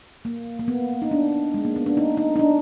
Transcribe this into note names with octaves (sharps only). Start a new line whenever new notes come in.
A#3
A#3
B3
D#4
D4
G#3
A#3
B3
D4
D#4
D#4
D#4
D4